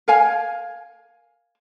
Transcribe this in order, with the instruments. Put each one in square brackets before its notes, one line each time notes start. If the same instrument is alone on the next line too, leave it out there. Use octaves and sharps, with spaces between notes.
[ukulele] A#4 F5 G#5